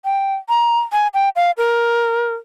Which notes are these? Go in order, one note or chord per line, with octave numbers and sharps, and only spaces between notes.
G5
A#5
G#5
G5
F5
A#4